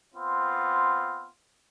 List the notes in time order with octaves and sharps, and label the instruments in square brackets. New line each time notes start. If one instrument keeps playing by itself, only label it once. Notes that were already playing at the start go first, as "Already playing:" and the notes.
[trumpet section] B3 C4 F4